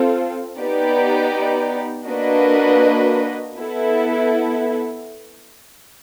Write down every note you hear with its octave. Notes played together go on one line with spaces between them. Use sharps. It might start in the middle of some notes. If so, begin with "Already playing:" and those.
Already playing: C4 F4 A4
B3 D#4 G4 B4 D5
A#3 D4 F#4 B4 D#5
B3 E4 A4